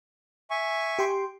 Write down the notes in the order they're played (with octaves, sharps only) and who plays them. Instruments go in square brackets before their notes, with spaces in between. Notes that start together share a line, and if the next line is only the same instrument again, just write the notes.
[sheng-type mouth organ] E5 G#5 C#6
[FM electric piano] G4 G5 C6